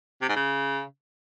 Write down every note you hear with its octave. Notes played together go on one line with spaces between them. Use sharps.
C3
G#2
C#3